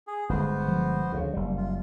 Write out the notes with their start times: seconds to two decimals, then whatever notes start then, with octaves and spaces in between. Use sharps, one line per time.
0.07 G#4
0.29 G1 D3 G#3 B3 F#4 C5
0.68 F3
1.12 D2 C#3
1.33 F#1 G3
1.57 F4